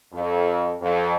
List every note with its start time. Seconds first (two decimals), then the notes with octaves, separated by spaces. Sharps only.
0.12 F2
0.81 F2